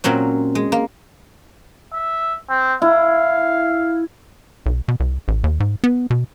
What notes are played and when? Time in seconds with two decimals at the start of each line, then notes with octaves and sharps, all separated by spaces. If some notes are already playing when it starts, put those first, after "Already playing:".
0.04 A#2 F#3 C4 C#4
0.55 G#3
0.72 A#3
1.94 E5
2.50 C4
2.82 E4 F5
4.66 B1
4.88 B2
5.00 C2
5.28 A1
5.44 D#2
5.60 G#2
5.84 B3
6.10 B2